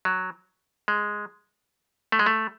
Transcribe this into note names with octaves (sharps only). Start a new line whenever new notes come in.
F#3
G#3
A3
G#3
A3